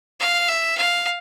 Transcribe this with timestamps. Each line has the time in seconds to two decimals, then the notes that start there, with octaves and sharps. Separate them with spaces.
0.20 F5
0.48 E5
0.77 F5